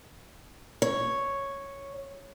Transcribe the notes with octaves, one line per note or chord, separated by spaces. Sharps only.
C#5